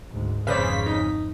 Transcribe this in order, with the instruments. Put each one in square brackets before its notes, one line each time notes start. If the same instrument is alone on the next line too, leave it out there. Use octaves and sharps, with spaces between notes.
[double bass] D2 G#2
[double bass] G#1 F2 [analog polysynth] C#3 B6 [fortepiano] B4 C5 D5
[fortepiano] D#4